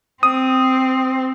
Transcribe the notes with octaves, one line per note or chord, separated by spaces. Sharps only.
C4 D#6